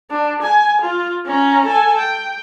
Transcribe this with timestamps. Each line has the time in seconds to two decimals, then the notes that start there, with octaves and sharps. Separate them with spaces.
0.11 D4
0.42 G#5
0.81 F4
1.25 C#4 A#5
1.65 A4 G#5
1.98 G5